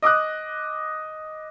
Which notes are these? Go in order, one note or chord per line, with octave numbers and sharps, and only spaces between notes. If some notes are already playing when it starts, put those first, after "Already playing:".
D#5 D6 D#6 F#6